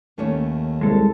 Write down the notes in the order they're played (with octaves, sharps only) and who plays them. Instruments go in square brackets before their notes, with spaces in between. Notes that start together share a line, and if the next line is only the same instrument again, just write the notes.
[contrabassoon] D#2 [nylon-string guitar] A3 C#4 C#5
[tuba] C2 [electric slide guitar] G#3 A4